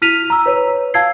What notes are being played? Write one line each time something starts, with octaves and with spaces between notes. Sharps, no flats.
E4 F6 B6 D#7 F7
A#5 E6
B4 C#5
F5 A5 E6 G#6 C7